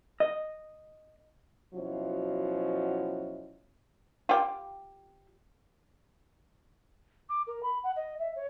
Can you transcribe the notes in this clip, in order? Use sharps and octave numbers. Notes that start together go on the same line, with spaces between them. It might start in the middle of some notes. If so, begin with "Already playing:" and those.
D#5
B2 F3 F#3 C#4 E4 F#4
F4 G4
D6
A#4
B5
F#5
D#5
E5
C#5